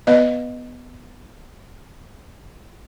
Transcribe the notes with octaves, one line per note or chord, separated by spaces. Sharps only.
B3 B4 D#5